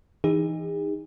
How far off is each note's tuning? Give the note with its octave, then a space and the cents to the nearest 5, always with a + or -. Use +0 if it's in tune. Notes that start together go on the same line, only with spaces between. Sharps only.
E3 +0 D#4 +0 G#4 -40